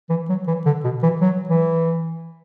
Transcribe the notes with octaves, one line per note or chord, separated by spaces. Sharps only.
E3
F#3
E3
D3
B2
E3
F#3
E3